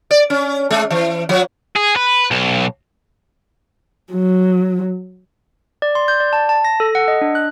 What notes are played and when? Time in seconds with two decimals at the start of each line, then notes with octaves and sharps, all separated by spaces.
0.11 D5
0.30 C#4
0.71 G#3
0.90 E3
1.29 F3
1.76 G#4
1.96 B4
2.31 B1
4.13 F#3
5.82 D5
5.95 C6
6.08 G6
6.20 D5
6.33 A5
6.49 A5
6.65 A#6
6.80 A4
6.95 F#5
7.08 D#5
7.21 D4
7.35 F#6